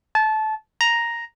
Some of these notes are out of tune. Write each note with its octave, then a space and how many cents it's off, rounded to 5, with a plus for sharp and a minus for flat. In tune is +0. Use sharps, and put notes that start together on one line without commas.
A5 -20
A#5 +5